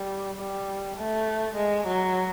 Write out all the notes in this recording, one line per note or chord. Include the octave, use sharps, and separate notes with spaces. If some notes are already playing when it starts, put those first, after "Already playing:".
Already playing: G3
G3
A3
G#3
F#3